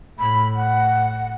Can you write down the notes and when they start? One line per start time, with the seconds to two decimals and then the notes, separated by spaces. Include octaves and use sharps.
0.19 A2 B5
0.56 F#5